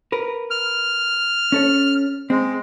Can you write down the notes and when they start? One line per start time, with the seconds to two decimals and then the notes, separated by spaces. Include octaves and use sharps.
0.12 A#4 B4
0.51 F6
1.52 C#4 A4 C#5
2.30 G#3 C4